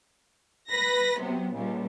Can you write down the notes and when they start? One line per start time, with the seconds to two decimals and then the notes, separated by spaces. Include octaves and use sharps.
0.70 B4 B5 A#6
1.20 C3 F#3 B3
1.54 C#2 A#2 G3